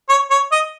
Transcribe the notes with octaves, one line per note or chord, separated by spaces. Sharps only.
C#5
C#5
D#5